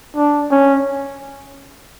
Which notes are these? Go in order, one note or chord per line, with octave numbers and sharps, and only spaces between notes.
D4
C#4